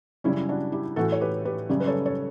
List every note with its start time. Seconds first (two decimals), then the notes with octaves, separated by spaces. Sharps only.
0.24 F#2 C#3 G3 C#4 E4
0.49 D4 F#4
0.72 E4 G4
0.96 A2 E3 A3 F#4 A4
1.12 C#5
1.20 G4 B4
1.45 G4 B4
1.69 F#2 C#3 G3
1.80 B4
1.87 A4 C#5
2.06 A4 C#5